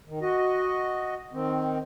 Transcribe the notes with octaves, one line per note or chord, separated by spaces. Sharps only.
D#3
F#4 D#5
D#3 C4